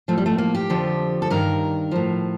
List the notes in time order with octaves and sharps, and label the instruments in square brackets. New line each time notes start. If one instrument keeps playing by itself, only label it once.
[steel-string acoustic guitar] A2 F3 A3
G3
A3
A#3
G4
F2 D3 F3
A4
G2 D#3 A#4
A2 F3